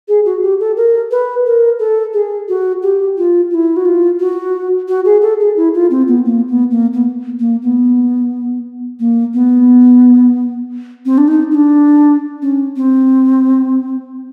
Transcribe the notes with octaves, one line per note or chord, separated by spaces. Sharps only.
G#4
F#4
G4
A4
A#4
B4
A#4
A4
G#4
F#4
G4
F4
F4
E4
F#4
F4
F#4
F#4
G#4
A4
G#4
E4
F4
C4
B3
A#3
B3
A#3
B3
A#3
B3
A#3
B3
C4
D4
D#4
D#4
D4
C#4
C4